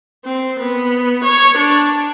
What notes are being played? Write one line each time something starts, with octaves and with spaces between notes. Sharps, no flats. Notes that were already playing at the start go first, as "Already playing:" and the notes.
C4
B3
C#5
D4